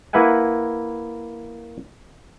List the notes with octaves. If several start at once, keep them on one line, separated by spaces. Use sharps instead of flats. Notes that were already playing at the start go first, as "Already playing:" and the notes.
A#3 E4 B4 E5 F#5 G#5